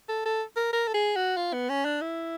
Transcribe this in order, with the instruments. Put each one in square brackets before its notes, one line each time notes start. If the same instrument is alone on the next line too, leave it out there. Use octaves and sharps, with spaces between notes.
[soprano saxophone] A4
A4
A#4
A#4
A4
G#4
F#4
F4
B3
C#4
D4
E4